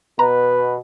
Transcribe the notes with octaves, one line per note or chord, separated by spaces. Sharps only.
B2 B4 A#5